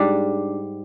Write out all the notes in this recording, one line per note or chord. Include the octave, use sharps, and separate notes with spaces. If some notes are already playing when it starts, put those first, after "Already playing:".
Already playing: G#2 G3 D4